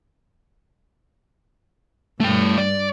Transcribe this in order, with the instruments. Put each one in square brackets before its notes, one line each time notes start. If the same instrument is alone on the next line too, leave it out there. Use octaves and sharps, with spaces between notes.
[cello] G2 [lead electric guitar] A3 G5
[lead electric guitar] D5